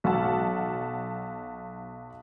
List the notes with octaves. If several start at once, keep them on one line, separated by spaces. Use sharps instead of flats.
B1 F#5 A5